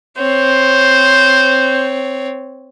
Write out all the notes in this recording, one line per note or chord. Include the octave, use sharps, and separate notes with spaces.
C4 C5 C#5